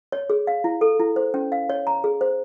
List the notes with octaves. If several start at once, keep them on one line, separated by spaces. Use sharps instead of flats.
C#5
G#4
F5
E4
A4
E4
C5
C#4
F5
C#5
A#5
G#4
C5